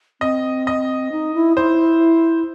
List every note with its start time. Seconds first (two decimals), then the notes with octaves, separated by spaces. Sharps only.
0.21 C4 D#5
0.67 D#5
1.12 D#4
1.34 E4
1.57 E4 C5